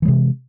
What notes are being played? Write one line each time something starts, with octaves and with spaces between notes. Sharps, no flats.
C3 E3 G#3